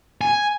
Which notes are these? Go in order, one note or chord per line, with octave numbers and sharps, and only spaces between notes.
G#5